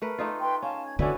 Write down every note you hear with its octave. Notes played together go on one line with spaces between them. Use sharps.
A3 A#4 B4
A3 D#4 F4
B4 G5 C6
C#4 F5 A5
G#6
D3 C#4 E4 F#4 A4 B4 D5